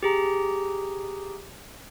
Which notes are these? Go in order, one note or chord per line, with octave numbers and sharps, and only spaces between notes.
G4 G#4 A#5